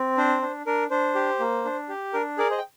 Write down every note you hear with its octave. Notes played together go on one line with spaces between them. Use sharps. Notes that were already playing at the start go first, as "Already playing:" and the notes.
Already playing: C4
D4 C5
D4
D4 A#4
D4 C5
G4
A#3
D4
G4
D4 A#4
G#4 A#4 D5
C5 D#5
G5